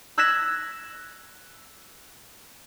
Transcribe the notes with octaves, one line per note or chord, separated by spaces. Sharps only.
E6 F#6 G#6 A#6 B6 E7